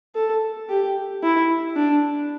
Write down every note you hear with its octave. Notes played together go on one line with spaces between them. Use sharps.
A4
G4
E4
D4